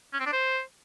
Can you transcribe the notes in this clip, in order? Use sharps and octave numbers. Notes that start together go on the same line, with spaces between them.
C#4
C4
D4
C5